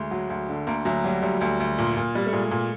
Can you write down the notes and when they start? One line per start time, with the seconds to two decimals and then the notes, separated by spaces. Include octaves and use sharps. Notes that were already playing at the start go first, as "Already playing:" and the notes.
Already playing: D2 G#3
0.11 F#3
0.30 D2
0.49 D3
0.67 D2 A#3
0.85 D2 F#3
1.04 F#3 G3
1.22 D2 G3
1.41 D2
1.60 D2
1.78 A#2
1.97 A#2
2.15 G3
2.27 A3
2.33 A#2 G#3
2.51 A#2